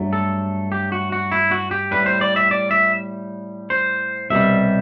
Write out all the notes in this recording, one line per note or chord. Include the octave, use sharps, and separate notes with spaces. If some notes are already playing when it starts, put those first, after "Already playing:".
Already playing: G2 F#3 A3
A4
G4
F#4
F#4
E4
F#4
G4
A2 G3 B4
C5
D5
E5
D5
E5
C5
C2 B2 G3 E5